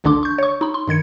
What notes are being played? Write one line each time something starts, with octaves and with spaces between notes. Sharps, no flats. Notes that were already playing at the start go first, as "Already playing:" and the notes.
G#1 D2 D3 D4 C6 D6
C#6 G6
C#5 C#6
D#4 B5
C6
G2 D#3 G#6 C#7